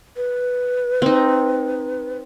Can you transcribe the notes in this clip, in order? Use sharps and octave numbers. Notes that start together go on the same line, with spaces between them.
B4
C4 D#4